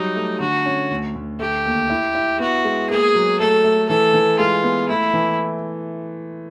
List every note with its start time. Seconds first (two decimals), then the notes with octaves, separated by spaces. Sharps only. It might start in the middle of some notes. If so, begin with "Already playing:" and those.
Already playing: F#3 G3 D#4
0.16 A3
0.40 D3 F#4
0.66 C#4
0.91 D2
1.15 D2
1.39 A3 G4
1.66 D#2
1.90 E4
2.15 E4
2.39 B3 F#4
2.64 G#3
2.90 A#3 G#4
3.15 F#3
3.39 A3 A4
3.64 A3
3.89 E3 A4
4.13 E3
4.39 G#3 F4
4.63 B3
4.89 A3 E4
5.13 E3